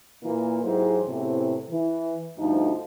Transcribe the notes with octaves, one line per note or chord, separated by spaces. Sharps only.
A#2 E3 A#3
G#2 E3 F#3 G#3 G4 C5
E2 A2 C3
E3
D2 G2 D3 F3 D#4